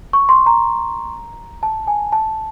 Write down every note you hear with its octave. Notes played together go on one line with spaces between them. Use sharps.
C#6
C6
A#5
A5
G#5
A5